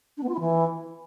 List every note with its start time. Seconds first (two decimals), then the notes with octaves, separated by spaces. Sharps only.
0.17 D4
0.23 B3
0.28 F4
0.34 E4
0.40 E3